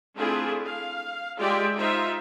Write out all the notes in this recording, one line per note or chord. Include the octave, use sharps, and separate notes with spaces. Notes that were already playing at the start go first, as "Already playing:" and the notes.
A3 C4 D4 E4 F4 G#4
F5
G#3 F4 G4 D5 E5 G5
D#4 F4 C5 E5